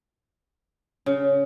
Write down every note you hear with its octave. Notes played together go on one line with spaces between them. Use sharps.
C#3